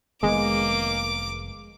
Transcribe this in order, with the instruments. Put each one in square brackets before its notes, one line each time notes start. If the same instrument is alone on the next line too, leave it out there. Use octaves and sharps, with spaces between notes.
[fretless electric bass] F1 D#3 B3 [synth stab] G#3 [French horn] A#3 [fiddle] D6